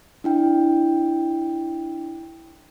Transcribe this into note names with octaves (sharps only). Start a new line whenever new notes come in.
D4 E4 G5